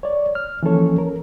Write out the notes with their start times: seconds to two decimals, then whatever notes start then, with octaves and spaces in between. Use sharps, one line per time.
0.03 C#5 D5
0.35 F6
0.63 E3 F3 A#3 C#4 A4 C#5
0.98 A#4